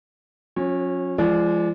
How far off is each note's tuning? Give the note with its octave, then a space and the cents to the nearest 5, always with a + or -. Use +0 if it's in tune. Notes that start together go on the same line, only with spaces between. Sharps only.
F3 +45 C#4 -20
F3 -30 G#3 +0 D5 +0